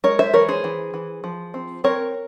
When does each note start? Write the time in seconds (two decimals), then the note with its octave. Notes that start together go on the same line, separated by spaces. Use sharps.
0.04 G#3 A#4 C#5
0.19 C5 E5
0.34 E3 A#4 C#5
0.49 G#4 C5
0.64 E3
0.94 E3
1.24 F3
1.54 C4
1.84 C4 A#4 C#5